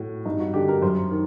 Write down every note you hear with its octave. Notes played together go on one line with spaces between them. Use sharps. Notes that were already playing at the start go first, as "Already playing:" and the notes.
Already playing: A2 F#4
G2 D#4
F#4
D3 G4
A#4
F#2 C5
D#3